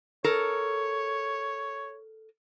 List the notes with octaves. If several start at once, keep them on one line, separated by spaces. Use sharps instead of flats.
A4 A#4 C#5